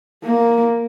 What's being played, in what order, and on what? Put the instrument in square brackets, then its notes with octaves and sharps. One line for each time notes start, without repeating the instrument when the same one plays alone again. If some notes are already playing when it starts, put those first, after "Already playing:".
[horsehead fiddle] A#3